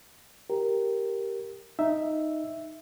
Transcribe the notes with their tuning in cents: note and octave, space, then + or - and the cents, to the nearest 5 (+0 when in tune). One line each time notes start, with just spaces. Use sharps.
G4 +0 A#4 +0
D#4 +0 E5 +0